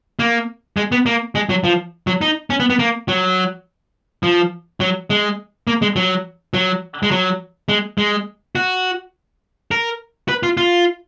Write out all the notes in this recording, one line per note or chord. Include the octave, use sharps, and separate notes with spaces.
A#3
G#3
B3
A#3
G#3
F#3
F3
F#3
D#4
C#4
B3
B3
A#3
F#3
F3
F#3
G#3
A#3
G#3
F#3
F#3
G#3
F#3
G#3
G#3
F#4
A#4
B4
F4
F4